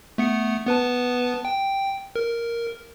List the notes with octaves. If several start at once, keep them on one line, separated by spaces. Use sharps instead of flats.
A3 B3 C#7
B3 B4 A5
G5
A#4